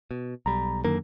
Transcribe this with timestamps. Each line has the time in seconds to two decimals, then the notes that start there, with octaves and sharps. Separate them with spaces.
0.11 B2
0.46 B1 G3 A#5 B5
0.84 F#2 D3 D#3 A#3 A#4